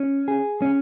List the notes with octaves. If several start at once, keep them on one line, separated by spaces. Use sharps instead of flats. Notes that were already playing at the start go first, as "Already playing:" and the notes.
Already playing: C#4
G#4
C#4